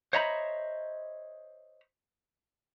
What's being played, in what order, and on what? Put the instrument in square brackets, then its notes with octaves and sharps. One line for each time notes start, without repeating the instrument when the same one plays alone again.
[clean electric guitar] C5 C#5 D#5 E5 A#5 B5